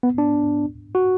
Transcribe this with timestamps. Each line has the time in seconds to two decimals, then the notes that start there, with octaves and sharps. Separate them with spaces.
0.03 B3
0.18 D4
0.95 F#4